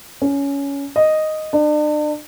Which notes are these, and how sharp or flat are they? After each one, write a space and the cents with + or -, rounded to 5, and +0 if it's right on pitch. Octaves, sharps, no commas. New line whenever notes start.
C#4 +15
D#5 -5
D4 +40